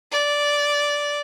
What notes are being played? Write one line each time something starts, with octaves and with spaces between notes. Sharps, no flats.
D5